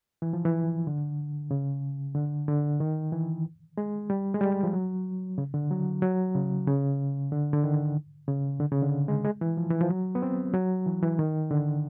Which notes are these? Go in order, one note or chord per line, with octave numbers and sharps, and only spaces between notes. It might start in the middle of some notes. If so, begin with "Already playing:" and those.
E3
F3
E3
D3
C#3
D3
D3
D#3
E3
G#3
G3
G#3
G3
F3
F#3
C#3
D3
F#3
F#3
C#3
C#3
D3
D3
D#3
C#3
D3
C#3
D3
G#3
G#3
E3
F3
E3
F3
F#3
B3
C4
F#3
E3
E3
D#3
D3